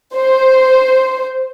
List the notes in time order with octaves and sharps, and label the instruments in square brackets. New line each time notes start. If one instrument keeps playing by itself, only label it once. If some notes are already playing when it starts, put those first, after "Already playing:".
[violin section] C5